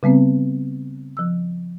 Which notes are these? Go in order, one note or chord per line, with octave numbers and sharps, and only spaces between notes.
C#3 G3 B3 C4
F3 E6